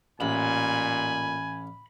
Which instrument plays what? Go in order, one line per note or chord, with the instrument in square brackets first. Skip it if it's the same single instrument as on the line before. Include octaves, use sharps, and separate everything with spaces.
[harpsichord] A1 [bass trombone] A#2 [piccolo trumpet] G#5 [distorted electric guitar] B5